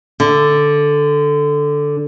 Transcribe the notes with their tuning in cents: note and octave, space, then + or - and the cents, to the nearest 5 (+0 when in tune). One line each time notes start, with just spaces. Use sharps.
D3 +0